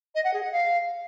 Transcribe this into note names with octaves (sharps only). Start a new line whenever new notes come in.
D#5
F#5
G#4
F#5
F5